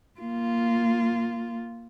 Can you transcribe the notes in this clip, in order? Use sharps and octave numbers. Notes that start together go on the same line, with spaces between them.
A#3 F4